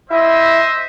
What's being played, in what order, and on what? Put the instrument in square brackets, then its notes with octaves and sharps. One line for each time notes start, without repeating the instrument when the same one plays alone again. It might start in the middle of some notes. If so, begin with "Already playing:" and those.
[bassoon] E4 [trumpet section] C5 D#5 E5